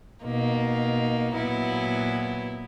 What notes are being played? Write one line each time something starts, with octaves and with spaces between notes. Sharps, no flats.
B2 A#3 D#4
A#2 F#3 B3 E4